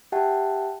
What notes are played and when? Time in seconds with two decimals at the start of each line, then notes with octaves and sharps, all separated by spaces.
0.12 G4 E5 F#5 G5 A5